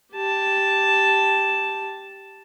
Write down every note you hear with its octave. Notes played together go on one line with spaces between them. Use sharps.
G4 A5